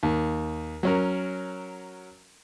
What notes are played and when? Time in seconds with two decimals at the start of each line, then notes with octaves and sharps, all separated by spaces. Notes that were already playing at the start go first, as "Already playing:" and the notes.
0.03 D#2
0.83 F#3 C#4 A#4